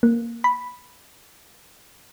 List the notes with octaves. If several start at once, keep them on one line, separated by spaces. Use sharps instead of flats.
A#3
B5